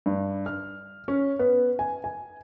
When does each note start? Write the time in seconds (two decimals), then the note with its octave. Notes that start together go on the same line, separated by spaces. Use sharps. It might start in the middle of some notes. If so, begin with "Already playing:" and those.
0.06 G2
0.46 F6
1.08 C#4
1.39 B3
1.79 G#5
2.04 G#5